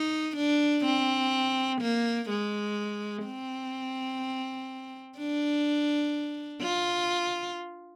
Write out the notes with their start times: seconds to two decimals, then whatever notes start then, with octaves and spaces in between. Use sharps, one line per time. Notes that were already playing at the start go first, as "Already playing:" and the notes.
Already playing: D#4
0.37 D4
0.85 C4
1.81 A#3
2.30 G#3
3.25 C4
5.18 D4
6.62 F4